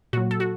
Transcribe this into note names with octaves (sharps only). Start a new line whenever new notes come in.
A#2 F#3 F#4
A4
F#4